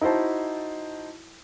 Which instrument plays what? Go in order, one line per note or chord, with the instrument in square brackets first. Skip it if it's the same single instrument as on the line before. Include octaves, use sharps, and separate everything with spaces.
[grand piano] D#4 E4 F#4 C5 A5